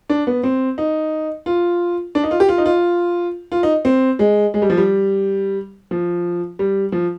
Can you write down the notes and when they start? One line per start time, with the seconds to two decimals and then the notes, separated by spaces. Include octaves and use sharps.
0.10 D4
0.27 B3
0.43 C4
0.78 D#4
1.46 F4
2.15 D4
2.24 D#4
2.31 F4
2.40 G4
2.49 F4
2.58 D#4
2.66 F4
3.52 F4
3.63 D#4
3.85 C4
4.19 G#3
4.54 G#3
4.62 G3
4.70 F3
4.77 G3
5.91 F3
6.59 G3
6.92 F3